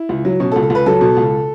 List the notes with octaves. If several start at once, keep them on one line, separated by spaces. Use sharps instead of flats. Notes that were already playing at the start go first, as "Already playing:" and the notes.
Already playing: E4
C#2
F#3
B2 C#4
A4
C#2
A4
C#2 B4
F#3 A4
B2
C#2